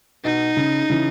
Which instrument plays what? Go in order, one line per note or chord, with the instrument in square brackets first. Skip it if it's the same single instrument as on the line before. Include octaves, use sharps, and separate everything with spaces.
[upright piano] B2 [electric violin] D#4
[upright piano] C#3
C#3 E3